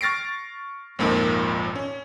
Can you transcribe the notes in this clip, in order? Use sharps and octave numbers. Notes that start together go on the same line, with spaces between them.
C#6 F6 A6 A#6 C7 D7
G#1 F2 A#2 F3 D#4 A#4
C#4